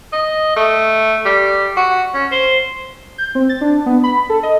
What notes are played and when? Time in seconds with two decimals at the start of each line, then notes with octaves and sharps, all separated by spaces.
0.13 D#5
0.56 A3
1.25 G3
1.77 F#4
2.14 C#4
2.32 C5
3.18 G6
3.35 C4
3.49 A6
3.61 D4
3.86 B3
4.04 B5
4.29 A4
4.43 D#5